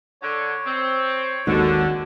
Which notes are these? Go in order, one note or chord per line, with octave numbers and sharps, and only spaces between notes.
D3 C#5
C4
G#1 D#2 G#2 D3 F#4